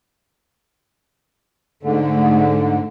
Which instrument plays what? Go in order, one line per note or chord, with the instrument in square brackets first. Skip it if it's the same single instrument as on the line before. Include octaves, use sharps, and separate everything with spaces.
[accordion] G#2 D3 [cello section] A3